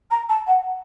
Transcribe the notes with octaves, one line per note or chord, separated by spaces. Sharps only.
A#5
A5
F#5